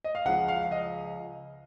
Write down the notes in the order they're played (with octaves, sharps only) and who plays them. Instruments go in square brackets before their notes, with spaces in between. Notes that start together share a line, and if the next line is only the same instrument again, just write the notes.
[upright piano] D#5
F5
C#2 C#3 F3 F#5
F5
D#5